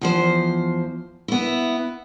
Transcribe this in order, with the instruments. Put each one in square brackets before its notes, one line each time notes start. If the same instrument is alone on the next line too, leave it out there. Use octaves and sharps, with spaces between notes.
[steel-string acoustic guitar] E2 F3 C5
B3 E4